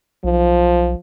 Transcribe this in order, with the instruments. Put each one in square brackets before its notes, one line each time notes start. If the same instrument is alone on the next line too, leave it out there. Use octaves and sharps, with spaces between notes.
[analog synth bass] B1 [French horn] F3